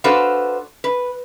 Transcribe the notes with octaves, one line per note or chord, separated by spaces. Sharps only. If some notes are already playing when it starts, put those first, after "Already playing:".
D4 F#4 A4 B4 C5 F5
B4